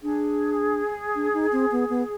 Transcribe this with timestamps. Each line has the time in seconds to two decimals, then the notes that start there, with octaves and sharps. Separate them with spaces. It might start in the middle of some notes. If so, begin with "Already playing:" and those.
0.03 D4 G#4
1.15 D4
1.33 D#4
1.52 C4
1.72 B3
1.90 B3